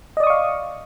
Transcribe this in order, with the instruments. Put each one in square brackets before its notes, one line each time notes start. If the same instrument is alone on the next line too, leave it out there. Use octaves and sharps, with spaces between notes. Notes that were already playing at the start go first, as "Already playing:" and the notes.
[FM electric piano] D#5
D5
D#6
C#6
F5